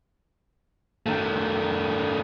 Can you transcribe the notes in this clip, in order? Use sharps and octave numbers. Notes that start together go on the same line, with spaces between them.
D#3 A3